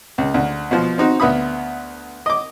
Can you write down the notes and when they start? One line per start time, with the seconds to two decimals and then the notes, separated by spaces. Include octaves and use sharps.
0.18 C#2
0.34 D2
0.71 B2 F3
0.98 C4 D#4 F#4
1.20 D2 B3 E5 B5 D#6
2.26 D#5 D6